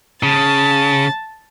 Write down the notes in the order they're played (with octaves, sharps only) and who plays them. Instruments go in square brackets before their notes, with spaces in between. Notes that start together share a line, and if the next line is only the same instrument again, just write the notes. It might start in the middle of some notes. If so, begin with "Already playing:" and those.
[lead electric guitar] C#3 [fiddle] A5